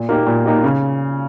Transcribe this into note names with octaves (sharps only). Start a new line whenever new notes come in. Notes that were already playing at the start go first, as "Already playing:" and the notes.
Already playing: A#2
A#3 D#4 G4
A#2
A#3 D#4 G4
C#3